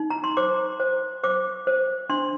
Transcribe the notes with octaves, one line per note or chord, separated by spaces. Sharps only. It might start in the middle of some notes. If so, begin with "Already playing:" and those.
Already playing: D#4
A#5
C6
C5 D6
C5
C5 D6
C5
D4 C6